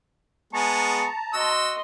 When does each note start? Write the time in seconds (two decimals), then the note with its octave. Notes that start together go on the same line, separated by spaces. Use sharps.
0.53 G#3 B3 G#4 A5 A#5 C#6
1.34 F#4 D#5 C6 E6